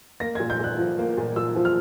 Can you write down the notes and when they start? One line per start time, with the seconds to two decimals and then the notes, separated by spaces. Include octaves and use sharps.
0.20 A#3 A#6
0.35 A#2 G#6
0.50 G6
0.59 A#2 F#6
0.78 F3
0.98 A#3
1.17 A#2
1.36 A#2 E6
1.56 F3
1.65 F6